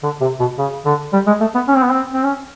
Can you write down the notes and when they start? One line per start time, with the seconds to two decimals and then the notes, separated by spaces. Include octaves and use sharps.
0.03 D3
0.21 C3
0.40 B2
0.58 C#3
0.85 D3
1.13 G3
1.27 G#3
1.41 A3
1.55 B3
1.68 C#4
1.76 C4
1.83 B3
1.90 C4
2.14 C4
2.23 C#4